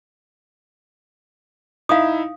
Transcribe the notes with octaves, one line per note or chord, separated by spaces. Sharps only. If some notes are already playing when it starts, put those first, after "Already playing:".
D#4 E4 E5 F5 D#6